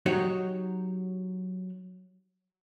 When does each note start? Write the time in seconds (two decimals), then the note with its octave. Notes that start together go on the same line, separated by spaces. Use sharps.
0.06 F#3 D#4 F#4 G4 C#5